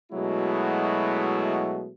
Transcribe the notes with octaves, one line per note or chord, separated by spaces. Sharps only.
B2 F#3 G#3 A3 E4 F#4